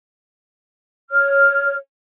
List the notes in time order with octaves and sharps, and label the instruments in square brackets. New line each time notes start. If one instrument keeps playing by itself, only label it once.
[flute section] C#5 F6